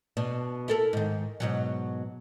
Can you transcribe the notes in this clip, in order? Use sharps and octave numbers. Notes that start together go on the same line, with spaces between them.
B2 D4
E4 A4 A#4
G#2 D#3
G#2 B2 F#3